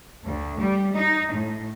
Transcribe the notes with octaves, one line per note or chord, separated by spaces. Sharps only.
D2
G3
D#4
A2